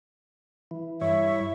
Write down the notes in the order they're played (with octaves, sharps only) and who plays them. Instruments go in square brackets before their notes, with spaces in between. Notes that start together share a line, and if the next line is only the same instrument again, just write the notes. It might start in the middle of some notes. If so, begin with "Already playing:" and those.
[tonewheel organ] E3
[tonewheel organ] G2 E4 C#5 [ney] E5